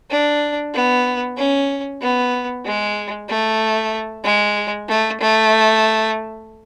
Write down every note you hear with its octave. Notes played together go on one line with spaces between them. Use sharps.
D4
B3
C#4
B3
G#3
A3
G#3
A3
A3